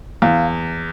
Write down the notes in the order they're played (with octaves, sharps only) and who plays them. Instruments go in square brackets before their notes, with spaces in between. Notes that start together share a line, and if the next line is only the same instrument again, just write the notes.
[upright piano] E2 [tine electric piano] F5